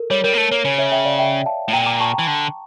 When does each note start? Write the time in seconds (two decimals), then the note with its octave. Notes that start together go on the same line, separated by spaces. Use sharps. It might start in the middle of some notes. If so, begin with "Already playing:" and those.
Already playing: A4 A#4
0.10 G3 C#5
0.24 G3 A#4
0.33 A#3
0.38 A3 A#4
0.51 A#3 C#5
0.65 C#3 C#5
0.78 C#5 E5
0.92 E5 G5
1.05 D5 F5
1.19 E5 G5
1.46 F5 A5
1.68 A2
1.73 A#2 G5 A#5
1.86 A#5 D6
2.00 A5 C#6
2.13 G5 A#5
2.19 E3
2.27 D3